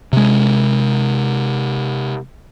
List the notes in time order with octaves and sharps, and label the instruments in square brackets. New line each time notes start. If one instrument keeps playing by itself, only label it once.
[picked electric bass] C3 G#3